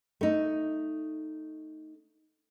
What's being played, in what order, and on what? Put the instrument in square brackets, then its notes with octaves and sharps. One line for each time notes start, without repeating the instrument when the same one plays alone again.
[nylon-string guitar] A3 D#4